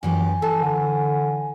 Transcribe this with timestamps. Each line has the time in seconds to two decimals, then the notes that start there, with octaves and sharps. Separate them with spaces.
0.03 F#2 E3 G4 G#5
0.42 E3 A4
0.62 D3